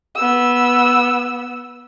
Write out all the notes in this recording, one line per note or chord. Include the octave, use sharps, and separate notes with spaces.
B3 E6